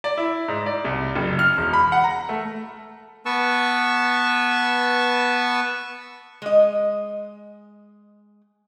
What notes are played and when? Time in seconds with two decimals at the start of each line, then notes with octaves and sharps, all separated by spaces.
0.04 D5
0.17 E4
0.48 G#2
0.66 D5
0.84 C2
1.15 F#1
1.39 F6
1.57 E1
1.73 B5
1.92 F#5
2.04 A#5
2.29 A3
3.26 B3 B4 A5 C#6 E6
6.42 G#3 D#5